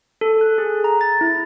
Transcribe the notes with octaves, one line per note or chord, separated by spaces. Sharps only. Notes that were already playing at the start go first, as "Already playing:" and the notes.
A4
F#6
G#4
A#5
A6
E4